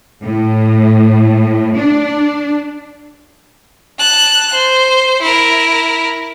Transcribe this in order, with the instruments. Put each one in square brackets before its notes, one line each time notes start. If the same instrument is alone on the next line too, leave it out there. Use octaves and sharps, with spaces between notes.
[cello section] A2
D4
[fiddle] A5 F#6
C5
E4 A#4